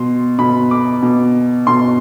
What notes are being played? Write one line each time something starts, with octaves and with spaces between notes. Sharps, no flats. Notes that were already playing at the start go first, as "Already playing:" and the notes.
Already playing: B2 C6
B2 B5
D6
B2
B2 C6